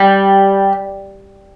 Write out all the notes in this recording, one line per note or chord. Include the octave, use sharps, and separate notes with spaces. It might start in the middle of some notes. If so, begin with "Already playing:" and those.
Already playing: G3